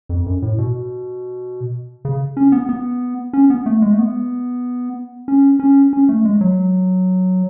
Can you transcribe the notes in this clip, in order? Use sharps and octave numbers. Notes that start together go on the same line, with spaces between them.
F2
F#2
A2
B2
C#3
C#4
B3
B3
C#4
B3
A3
G#3
A3
B3
C#4
C#4
C#4
A3
G#3
F#3